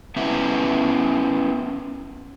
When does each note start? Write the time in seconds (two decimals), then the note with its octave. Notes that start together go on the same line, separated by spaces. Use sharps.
0.16 B3 C#4 E4 B4 E5 F#5